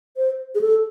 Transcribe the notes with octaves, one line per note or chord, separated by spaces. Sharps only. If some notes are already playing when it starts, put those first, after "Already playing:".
C5
G#4
A4